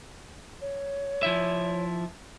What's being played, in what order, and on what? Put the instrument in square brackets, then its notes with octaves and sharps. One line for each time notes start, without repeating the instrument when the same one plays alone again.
[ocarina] C#5
[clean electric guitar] F3 E4 E5